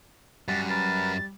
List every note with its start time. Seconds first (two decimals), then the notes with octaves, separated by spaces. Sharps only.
0.48 F#2 G3 F#5 A6
0.70 A#4 B4 A6